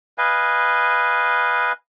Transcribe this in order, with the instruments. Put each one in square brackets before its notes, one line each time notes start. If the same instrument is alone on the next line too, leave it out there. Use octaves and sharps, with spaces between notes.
[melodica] B4 D#5 F5 G#5